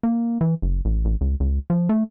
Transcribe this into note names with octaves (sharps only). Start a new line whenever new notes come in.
A#3
E3
F#1
A1
A1
C#2
C#2
F3
A3